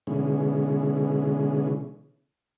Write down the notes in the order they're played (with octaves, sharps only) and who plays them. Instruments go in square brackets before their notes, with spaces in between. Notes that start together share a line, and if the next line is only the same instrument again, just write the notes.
[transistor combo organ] B2 D3 E3 G#3 C#4